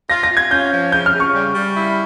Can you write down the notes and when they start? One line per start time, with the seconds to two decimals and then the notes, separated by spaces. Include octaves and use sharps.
0.10 F4 A#6
0.23 A#6
0.31 F4
0.37 G#6
0.51 C#4 G6
0.72 F3
0.92 C#3 G6
1.06 F6
1.13 C#3
1.20 C#6
1.34 G3
1.54 G3
1.75 E4